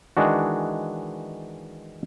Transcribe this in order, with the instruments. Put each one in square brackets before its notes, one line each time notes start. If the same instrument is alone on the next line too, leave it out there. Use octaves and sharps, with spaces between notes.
[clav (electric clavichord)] D#3 E3 G#3 D4 F#4